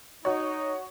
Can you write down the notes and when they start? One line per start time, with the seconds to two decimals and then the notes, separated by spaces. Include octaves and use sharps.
0.25 D#4 F#4 C#5